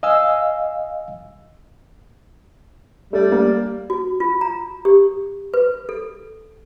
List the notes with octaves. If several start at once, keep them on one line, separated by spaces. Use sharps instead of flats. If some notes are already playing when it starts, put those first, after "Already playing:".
D#5 F5 G#5 E6
G3 A3
A#3
F#4
F4
A#5
G4
B4
A4